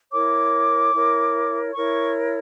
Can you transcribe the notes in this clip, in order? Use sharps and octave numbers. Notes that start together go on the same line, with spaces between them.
E4 A#4 C#5 D6
E4 A#4 C#5
E4 A#4 C#5 C#6